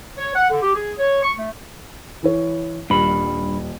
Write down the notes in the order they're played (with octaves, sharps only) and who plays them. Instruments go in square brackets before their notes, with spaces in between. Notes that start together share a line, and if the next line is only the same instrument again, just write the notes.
[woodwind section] C#5
F#5
D3
G4
G#4
C#5
C#6
A3
[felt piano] E3 E4 C#5
[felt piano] D#1 [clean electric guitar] G2 B5